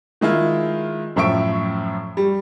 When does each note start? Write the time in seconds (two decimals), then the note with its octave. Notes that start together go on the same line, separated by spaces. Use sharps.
0.21 D#3 G#3 E4 F4
1.16 F#2 A2 F3 E5 C#6 D7
2.17 G3